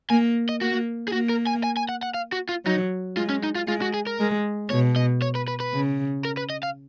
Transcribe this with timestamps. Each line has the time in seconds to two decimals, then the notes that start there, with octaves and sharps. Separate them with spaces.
0.10 A#3 G#5
0.49 D#5
0.61 A#3 F#4
1.08 G#4
1.12 A#3 F#4
1.29 A#4
1.47 G#5
1.64 G#5
1.77 G#5
1.89 F#5
2.03 F#5
2.14 F5
2.32 F#4
2.49 F4
2.65 F#3 D#4
3.17 G#3 F4
3.29 C#4
3.43 D#4
3.55 F4
3.68 G#3 F4
3.82 F#4
3.94 G#4
4.07 A#4
4.20 G#3
4.70 B2 C#5
4.96 D#5
5.22 C#5
5.35 B4
5.48 B4
5.60 B4
5.73 C#3
6.25 A#4
6.37 B4
6.50 D#5
6.63 F5